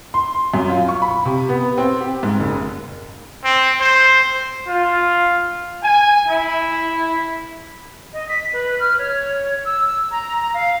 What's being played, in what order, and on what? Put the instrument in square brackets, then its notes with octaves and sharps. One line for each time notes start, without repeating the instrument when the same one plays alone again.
[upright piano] C6
F#2
F4
C#6
B5
C3
B3
C4
G4
G#2
F#1
[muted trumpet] C4
C5
[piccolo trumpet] F4
[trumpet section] G#5
E4
[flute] D#5
B6
B4
F6
C#5
E6
A#5
F5